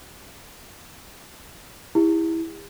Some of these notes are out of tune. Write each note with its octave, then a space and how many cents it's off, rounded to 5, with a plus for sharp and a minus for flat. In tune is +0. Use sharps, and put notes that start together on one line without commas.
E4 -10 G4 +45